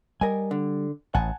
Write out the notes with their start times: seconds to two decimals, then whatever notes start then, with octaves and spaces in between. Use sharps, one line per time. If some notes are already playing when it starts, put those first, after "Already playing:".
0.21 G3 A#4 D#5 G#5
0.51 D3
1.15 A1 F#5 G#5 A5